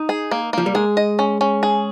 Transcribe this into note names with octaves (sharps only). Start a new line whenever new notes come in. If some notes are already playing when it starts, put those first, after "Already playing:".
Already playing: D#4
G#4
A#3
F3 A#3
G3
G#3 G#4
D#5
C#4
C#4
G#4